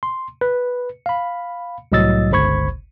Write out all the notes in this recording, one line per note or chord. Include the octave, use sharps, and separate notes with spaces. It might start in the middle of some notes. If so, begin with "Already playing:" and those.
C6
B4
F5 B5
C2 A2 F#3 D#5 E6 A6
G1 C#2 C5 B5 C#6 G#6